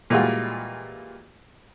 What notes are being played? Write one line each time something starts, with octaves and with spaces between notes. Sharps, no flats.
A#2 E3 G3 G#3 F4 F#4